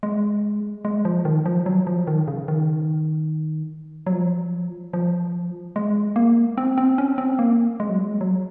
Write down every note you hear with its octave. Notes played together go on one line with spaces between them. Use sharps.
G#3
G#3
F3
D#3
F3
F#3
F3
D#3
C#3
D#3
F#3
F3
F3
G#3
A#3
C4
C4
C#4
C4
A#3
G#3
F#3
G#3
F#3